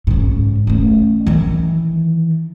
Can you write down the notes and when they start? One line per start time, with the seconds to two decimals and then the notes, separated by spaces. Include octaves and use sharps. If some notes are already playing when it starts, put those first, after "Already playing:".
0.07 G#2 C#3
0.67 A3 C#4
1.27 D#3 E3